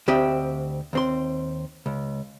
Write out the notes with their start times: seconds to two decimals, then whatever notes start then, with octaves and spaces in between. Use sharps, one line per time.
0.08 D2 C4 G4 D#5
0.93 D#2 C4 C6
1.86 C#2